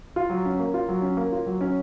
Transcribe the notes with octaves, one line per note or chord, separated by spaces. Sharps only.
F4
F#3
C#4
A#3
F4
F#3
C#4
A#3
F4
F#3
C#4